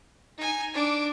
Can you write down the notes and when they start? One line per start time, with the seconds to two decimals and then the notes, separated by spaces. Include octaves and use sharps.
0.38 D#4 G#5
0.74 D4 D6